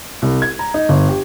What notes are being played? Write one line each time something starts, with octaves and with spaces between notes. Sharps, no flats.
C2
G#6
A#5
D#4
G1
G4